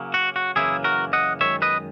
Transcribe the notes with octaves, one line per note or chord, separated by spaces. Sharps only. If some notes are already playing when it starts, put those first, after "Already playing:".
Already playing: C#3 F#3 A#3
F#4
F#4
F#2 C#3 E3 A#3 E4 G#4
F#4 A#4
D#5 F#5
F#2 D#3 G#3 C#5 E5
B4 D#5